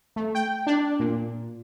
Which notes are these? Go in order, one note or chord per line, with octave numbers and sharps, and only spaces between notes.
A3
G5
D4
A#2